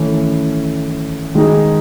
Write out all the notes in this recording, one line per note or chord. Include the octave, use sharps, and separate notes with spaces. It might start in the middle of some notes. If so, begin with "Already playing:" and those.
Already playing: D#3 E3 A3 C#4
D#3 G#3 D#4 G#4